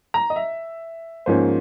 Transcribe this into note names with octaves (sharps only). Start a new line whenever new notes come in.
A#5
D#5
E5
G#2 F3 A#3 C#4 C5